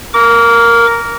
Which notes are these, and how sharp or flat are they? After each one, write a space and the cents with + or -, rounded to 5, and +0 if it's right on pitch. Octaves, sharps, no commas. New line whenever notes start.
A#4 +0 D6 -35